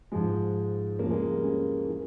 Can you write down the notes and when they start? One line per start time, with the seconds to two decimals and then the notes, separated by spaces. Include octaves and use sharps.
0.12 G#2 F3 G#3
0.99 E2 C#3 F3 A#3
1.10 G#3
1.33 G3
1.44 C#4
1.88 E3